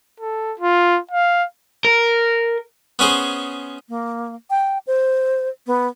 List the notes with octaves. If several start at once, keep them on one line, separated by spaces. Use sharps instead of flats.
A4
F4
F5
A#4
B3 C#4 G#4 C5
A#3
G5
C5
B3